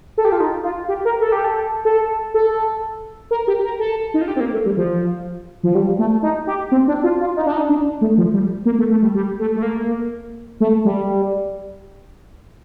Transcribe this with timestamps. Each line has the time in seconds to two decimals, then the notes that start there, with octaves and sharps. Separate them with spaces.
0.18 A4
0.25 G4
0.32 F4
0.40 D#4
0.64 F4
0.88 G4
1.05 A#4
1.21 A4
1.32 G4
1.44 A4
1.85 A4
2.34 A4
3.31 A#4
3.47 G4
3.64 A#4
3.79 A4
4.14 D#4
4.21 F4
4.28 G4
4.36 C4
4.40 A#3
4.53 A3
4.65 G3
4.77 F3
5.63 F3
5.75 G3
5.99 A3
6.22 D#4
6.47 G4
6.72 C4
6.88 D4
7.04 F4
7.21 F4
7.36 D#4
7.46 D4
7.52 D#4
7.69 D4
8.01 A3
8.18 F3
8.34 G3
8.65 A#3
8.79 A3
8.91 A3
9.02 G3
9.14 G3
9.39 A3
9.56 A3
9.62 A#3
10.60 A3
10.85 G3